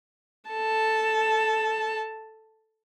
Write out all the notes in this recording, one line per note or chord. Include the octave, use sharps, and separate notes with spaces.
A4 A5